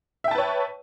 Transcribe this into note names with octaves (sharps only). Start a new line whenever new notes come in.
B4 C#5 E5 G5 A5